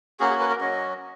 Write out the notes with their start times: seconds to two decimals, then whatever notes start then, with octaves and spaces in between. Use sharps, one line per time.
0.20 A#3 C#4 F#4 G#4
0.30 G#4
0.40 B4
0.50 A#4
0.61 F#3 C#4 F#4 D#5